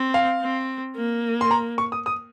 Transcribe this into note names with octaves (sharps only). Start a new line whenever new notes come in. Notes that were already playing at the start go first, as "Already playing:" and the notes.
Already playing: C4
F5
C4
A#3
C6
A#5
C#6
D#6
D#6